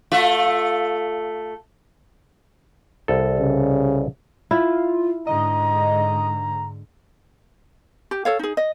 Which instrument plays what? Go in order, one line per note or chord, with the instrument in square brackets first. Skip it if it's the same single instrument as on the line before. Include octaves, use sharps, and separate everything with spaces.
[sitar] A3 F4 E5
[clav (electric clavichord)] C2 A4
[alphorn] C#3
[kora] E4 [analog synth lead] F4
[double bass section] G#2 D3 [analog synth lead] D#5 [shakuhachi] A#5
[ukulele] G4
A4 C#5 F5
D#4 G#4
D#5